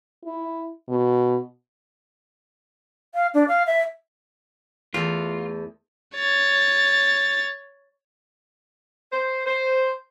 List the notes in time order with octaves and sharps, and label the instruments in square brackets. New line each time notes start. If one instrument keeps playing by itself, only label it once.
[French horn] E4
B2
[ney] F5
D4
F5
E5
[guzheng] E2 A4 [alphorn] A3 [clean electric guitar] F4
[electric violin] C#5 A6
[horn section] C5
C5